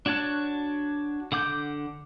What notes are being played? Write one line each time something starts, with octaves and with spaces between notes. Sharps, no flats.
D4 F#4 C#5 A5 F#6
D3 F#5 D6 G6